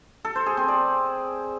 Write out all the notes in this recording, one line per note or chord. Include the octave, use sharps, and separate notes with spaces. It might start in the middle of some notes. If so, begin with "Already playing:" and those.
A4
C5
G#4
C4
D5